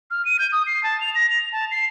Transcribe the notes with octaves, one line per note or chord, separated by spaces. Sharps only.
F6
D#7
G6
D#6
C7
A5
F7
A#6
F7
A5
C7